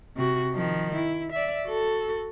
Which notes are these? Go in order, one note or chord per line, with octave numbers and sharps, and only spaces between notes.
C3 F#4
D#3 F3
E4
D5 E5
F#4 A4